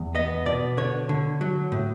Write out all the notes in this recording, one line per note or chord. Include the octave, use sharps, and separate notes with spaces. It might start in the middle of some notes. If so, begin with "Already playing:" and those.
Already playing: E2
B3 D#5
B2 D5
D3 C#5
D3
F#3
A2